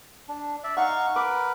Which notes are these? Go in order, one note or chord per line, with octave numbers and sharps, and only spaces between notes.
D4
D5 E5
D#4 F5 F#5 C#6
A#4 B4 B5 D6